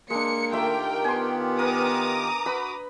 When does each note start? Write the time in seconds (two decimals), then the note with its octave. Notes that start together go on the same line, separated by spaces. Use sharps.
0.10 G#3 A#3 D4 C#7
0.52 D#3 A3 F4 G4 A#4 C5 E5 G5
1.04 B3 G#5 C6
1.59 A#4 B4 A#5 D6 D#6
2.46 F#4 B4 B5